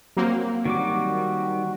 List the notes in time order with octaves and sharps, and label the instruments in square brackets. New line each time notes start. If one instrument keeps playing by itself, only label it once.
[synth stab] F#3 A#3 C4
[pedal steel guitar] D#3 G3 D6 [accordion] F#4